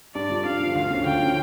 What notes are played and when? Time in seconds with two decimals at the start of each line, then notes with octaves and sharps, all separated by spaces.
0.15 G2 D5
0.30 D3 F3
0.45 G2 F5
0.60 D3 F3
0.75 D2 F5
0.91 D3 F3 C#4
1.06 D2 G5
1.21 D3 F3 C#4